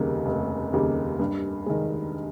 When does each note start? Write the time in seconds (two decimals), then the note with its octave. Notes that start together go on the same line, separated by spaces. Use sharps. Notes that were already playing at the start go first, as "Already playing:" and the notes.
Already playing: F1 D#2 C#3 G3 A#3
0.26 F1
0.73 D#2 C#3 G3 A#3
1.19 G2
1.66 D#3 G#3